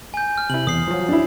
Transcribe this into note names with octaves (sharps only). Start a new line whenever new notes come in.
G#5 G6
F6
C3 E4 F#7
E2 D#6 C7
F3 F#3
D4 E4